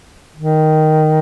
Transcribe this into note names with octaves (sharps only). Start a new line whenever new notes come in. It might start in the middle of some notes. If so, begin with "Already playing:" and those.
D#3